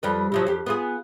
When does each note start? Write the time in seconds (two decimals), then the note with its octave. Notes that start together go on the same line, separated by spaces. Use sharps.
0.03 F2 G3 B4
0.32 C3 F3 F#3
0.47 F2 G4
0.66 B3 F4 G#4